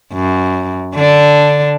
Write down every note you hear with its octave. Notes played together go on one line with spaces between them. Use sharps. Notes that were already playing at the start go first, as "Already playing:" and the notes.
F#2
D3 D4